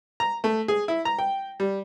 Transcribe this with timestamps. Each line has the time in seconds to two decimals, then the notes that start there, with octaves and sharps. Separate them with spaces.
0.20 A#5
0.44 A3
0.68 G#4
0.88 E4
1.05 A#5
1.19 G5
1.60 G3